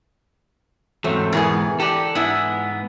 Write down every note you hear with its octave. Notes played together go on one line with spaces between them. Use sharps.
E2 G#2 F#3 A3 C4
B2 E3 B3 G#4 A#4
G4 A4 B4 D5 A#5
G#2 G#3 B3 E4